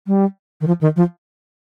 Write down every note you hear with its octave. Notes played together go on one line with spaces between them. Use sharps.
G3
D#3
F3
D#3
F3